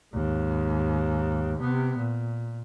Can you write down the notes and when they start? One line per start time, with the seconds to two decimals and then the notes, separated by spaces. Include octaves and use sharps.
0.13 D#2 G#2
1.58 C3 B3
1.97 A#2